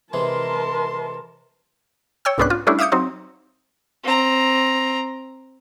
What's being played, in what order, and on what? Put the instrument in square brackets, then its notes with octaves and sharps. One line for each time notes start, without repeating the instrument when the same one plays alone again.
[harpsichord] C3 E3 G#3 [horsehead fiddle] A#4 A5 [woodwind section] C6
[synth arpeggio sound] C#5 G5 E6
C2 G#2 B3 C#4 D4 F#6
F4
G3 A3 C#4 D4 E4
E5 F5 D6 D#6 G6 C#7
F#3 C4 D#4
[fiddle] C4 A#5